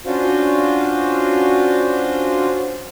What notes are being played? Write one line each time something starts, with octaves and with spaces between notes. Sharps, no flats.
C#4 D4 F4 F#4 C5 F5